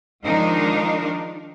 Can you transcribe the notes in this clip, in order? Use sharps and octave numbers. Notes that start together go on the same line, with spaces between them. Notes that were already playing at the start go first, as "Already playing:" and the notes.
D#3 F3 G#3 D4 D#4 A#4